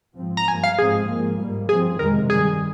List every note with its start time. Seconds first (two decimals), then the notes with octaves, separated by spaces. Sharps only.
0.17 G#2 F3 C4
0.37 A#5
0.48 G2 F3 A#3 G#5
0.64 F5
0.79 G#2 F3 G#3 C4 G#4
1.09 G#2 F3 A#3
1.39 G#2 G3 A#3
1.68 G2 F3 C4 G#4
1.99 F2 C3 D#3 G#3 A#4
2.29 G2 D#3 G3 G#4